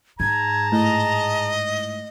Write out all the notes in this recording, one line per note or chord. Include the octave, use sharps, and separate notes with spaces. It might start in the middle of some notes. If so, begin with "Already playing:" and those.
G#2 G#4 A5 A#5 G#6
A2 D#5